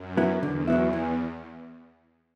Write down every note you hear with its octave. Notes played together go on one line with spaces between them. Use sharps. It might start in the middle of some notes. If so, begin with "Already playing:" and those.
Already playing: F#2
F#3 B3 E4
E2 D3
F#3 B3 E4
E3